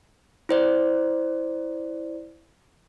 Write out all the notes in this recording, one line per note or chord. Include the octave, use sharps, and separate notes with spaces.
E4 C5 D5